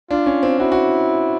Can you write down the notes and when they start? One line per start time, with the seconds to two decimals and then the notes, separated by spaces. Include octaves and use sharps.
0.11 D4 F4
0.26 C#4
0.43 C4
0.60 E4 F#4
0.72 F#4